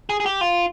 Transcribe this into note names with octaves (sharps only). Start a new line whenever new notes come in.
G#4
G#4
G4
F4